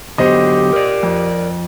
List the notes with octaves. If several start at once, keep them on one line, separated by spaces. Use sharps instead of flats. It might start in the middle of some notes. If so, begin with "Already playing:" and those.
D3 F#3 B3 G4 C5 D#5
A#4 D5
F2